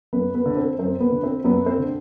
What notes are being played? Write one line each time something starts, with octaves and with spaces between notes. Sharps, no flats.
F#2 B3 B4
B3 B4
D3
C4 C5
F#2 C4 C5
B3 B4
D3
C4 C5
F#2 B3 B4
C4 C5
D3